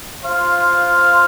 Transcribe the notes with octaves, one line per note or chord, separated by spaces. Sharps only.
F4 C5 F5